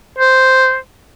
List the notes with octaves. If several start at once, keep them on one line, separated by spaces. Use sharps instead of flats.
C5